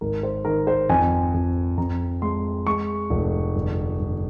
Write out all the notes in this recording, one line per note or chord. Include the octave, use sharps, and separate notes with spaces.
G#1 A#4
C5
D#3 A#4
C5
F2 G#5
F2
F2 A#5
G#3 C6
G#3 C#6
F1
G1
G1